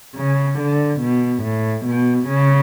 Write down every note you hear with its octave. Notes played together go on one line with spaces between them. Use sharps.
C#3
D3
B2
A2
B2
C#3